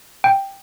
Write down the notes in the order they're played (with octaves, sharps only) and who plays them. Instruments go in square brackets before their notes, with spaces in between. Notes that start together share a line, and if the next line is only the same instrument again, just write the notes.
[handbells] G5